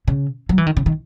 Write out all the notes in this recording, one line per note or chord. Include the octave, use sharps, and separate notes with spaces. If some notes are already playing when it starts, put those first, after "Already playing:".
C#3
F#3
E3
D#3
C#3
D#3